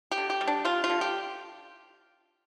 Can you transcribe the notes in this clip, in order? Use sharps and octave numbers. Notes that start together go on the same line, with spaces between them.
G4
D3
G4
G3
D4
G3 F4
F4
D3
G4